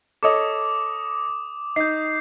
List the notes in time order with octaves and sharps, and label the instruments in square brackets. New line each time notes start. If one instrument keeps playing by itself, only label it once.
[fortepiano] A4 C#5 D#5 [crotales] D6 D#6
[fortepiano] D#4 [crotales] G6 C7